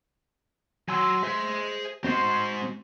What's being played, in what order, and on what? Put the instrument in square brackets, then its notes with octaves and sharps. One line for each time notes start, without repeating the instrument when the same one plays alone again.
[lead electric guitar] F#3 [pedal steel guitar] G#5 C6 E6
[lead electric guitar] G#4 C6 [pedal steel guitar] C5 E5
[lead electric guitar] G#3 C5 [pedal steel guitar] C4 F#4 C6